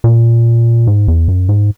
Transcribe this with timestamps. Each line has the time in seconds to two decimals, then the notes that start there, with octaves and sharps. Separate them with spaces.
0.04 A#2
0.87 G#2
1.08 E2
1.28 F#2
1.49 G#2